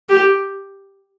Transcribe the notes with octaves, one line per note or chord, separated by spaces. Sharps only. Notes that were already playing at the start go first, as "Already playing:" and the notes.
G4